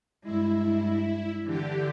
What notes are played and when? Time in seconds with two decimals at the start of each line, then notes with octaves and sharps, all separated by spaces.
0.23 G2 G#3 E4
1.44 D3 E3 G4